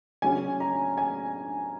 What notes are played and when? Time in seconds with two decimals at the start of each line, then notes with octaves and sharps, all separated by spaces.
0.22 C#3 F#3 C#4 G#5
0.60 A#5
0.98 G#5